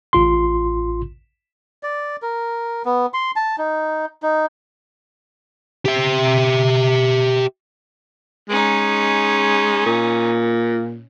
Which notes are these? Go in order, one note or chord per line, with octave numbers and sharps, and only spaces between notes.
A1 F4 C6
D5
A#4
B3
C6
A5
D#4
D#4
G4 E5
G#3 C#4 D#4
A#2